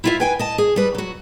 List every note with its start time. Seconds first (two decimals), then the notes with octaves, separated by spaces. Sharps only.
0.04 E4 F4 E5
0.20 B4 G5 G#5
0.39 D#5 A5
0.58 G#4
0.76 G3 B4
0.95 F#3 F#4